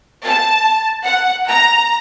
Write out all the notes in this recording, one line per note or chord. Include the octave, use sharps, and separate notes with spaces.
A5
F#5
A#5